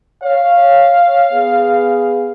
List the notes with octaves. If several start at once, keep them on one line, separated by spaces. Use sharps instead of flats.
C#5 F5
B3 G#4